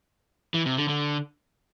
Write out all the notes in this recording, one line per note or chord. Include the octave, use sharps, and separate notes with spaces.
E3
C3
D3
D3